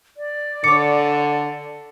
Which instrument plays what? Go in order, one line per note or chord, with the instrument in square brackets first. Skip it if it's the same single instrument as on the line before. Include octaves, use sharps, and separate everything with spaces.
[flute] D5
[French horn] D3 [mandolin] C#5 D6 [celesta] C#7